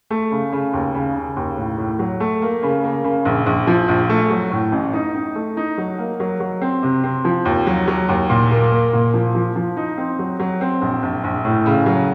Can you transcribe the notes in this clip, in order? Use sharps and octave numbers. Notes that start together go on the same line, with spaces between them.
A3
C#3
C#3
D#2
C#3
C#3
D#2
A2
A2
F#3
A3
A#3
C#3
A#3
C#3
A#1
A#1
F3
A#1
A3
F#3
A2
A1
D#4
D#4
A3
D#4
F#3
A#3
F#3
F#3
C4
C3
C4
F3
D#2
F#3
F#3
D#2
A#2
A#3
A#3
A#2
F3
F3
F3
D#4
C4
F#3
F#3
C4
A#1
A#1
A#1
A2
C#3
F#3